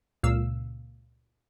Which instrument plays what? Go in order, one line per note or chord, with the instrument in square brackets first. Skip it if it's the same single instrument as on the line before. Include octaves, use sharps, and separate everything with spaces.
[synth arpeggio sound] C#2 A#2 F5 E6